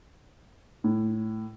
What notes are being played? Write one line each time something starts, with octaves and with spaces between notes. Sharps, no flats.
A2